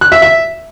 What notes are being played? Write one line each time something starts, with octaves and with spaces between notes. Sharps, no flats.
F#6
E5
E5